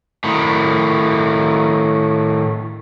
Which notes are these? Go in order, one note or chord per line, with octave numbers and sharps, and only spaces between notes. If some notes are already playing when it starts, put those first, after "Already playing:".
A2 D#3